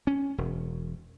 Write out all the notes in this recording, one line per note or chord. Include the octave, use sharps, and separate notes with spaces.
C#4
E1